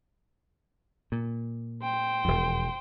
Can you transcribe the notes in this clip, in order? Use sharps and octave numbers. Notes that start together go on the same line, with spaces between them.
A#2
C5 G5
E1 F2